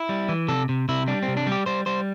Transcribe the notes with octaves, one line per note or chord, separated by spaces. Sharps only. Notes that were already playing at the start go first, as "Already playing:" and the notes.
Already playing: E4
G3
E3
C3 A4
C3
C3 E4
G3 D4
C4
C3
D4
G3
G4
G3 C5
G3 C5